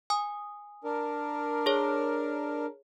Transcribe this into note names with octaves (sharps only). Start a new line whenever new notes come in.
G#5 D#6
D4 A#4
G#4 C#5